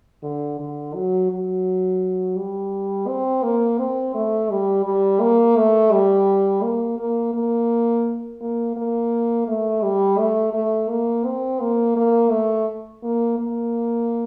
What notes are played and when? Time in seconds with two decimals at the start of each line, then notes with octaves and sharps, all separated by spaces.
0.23 D3
0.59 D3
0.94 F#3
1.31 F#3
2.37 G3
3.08 C4
3.43 A#3
3.78 C4
4.14 A3
4.50 G3
4.85 G3
5.21 A#3
5.56 A3
5.92 G3
6.62 A#3
6.98 A#3
7.34 A#3
8.41 A#3
8.76 A#3
9.48 A3
9.82 G3
10.18 A3
10.53 A3
10.89 A#3
11.25 C4
11.60 A#3
11.96 A#3
12.31 A3
13.03 A#3
13.38 A#3